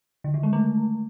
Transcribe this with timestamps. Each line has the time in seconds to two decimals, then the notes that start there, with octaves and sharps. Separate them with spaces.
0.24 D3
0.34 D#3
0.43 G#3
0.53 A3